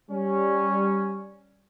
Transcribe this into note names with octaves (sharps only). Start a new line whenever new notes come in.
G3 C#4